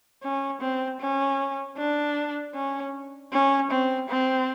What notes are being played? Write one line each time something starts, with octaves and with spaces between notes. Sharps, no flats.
C#4
C4
C#4
D4
C#4
C#4
C4
C4